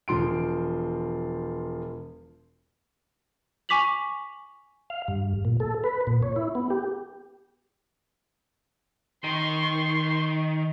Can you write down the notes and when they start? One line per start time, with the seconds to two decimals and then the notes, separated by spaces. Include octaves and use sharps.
0.08 E1 F3 C6 D7
3.69 G#5 C#6 D6 B6 F7 F#7
4.90 F5
5.08 G2
5.45 A#2
5.60 A4
5.84 B4
6.07 A#2
6.23 C#5
6.36 E4
6.55 B3
6.70 G4
9.24 D#3 C6 C#6